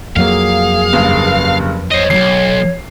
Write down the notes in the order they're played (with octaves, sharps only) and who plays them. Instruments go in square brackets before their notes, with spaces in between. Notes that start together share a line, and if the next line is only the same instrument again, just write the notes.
[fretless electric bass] F2 F#3 A#3 [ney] G#4 [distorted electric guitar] F5
[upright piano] F#1 G2
[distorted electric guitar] C5 D#5 [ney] C#5
[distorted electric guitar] B1 E2 [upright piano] C7